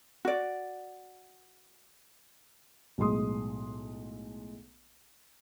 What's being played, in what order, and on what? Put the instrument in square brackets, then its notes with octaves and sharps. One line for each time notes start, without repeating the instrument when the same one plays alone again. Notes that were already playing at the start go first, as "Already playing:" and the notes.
[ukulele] F#4 D5
[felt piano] B1 A2 G#3 C6 D#6